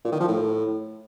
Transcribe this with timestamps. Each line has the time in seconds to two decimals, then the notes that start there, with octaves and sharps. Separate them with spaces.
0.05 A#2
0.12 D#3
0.20 F3
0.28 A2